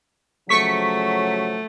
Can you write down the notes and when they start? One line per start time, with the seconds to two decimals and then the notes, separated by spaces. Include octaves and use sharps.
0.49 C#3 F3 F#3 A3 C#6 B6